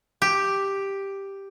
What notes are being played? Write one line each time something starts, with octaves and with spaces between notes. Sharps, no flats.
G4